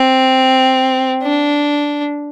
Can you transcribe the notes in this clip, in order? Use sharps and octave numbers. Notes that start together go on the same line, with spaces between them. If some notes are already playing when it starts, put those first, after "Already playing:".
Already playing: C4
D4